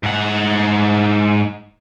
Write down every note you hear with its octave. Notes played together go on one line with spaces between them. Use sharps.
G#2 F#5